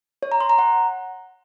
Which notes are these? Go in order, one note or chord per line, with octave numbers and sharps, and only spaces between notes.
C#5
A#5
C6
A#5
F#5